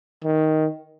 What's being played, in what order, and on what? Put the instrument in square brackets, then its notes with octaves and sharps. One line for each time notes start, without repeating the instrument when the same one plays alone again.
[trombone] D#3